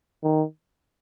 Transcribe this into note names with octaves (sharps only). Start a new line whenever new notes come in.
D#3